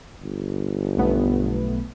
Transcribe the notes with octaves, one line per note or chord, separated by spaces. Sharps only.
G1
B1 A3 B3